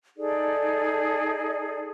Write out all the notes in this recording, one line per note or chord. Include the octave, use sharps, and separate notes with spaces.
D#4 G#4 A4 D5